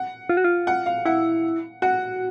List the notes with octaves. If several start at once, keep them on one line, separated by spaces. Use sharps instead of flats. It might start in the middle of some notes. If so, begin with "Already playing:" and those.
Already playing: F#5
F4
F#4
F4
F#5
F5
E4 F#5
F#4 F#5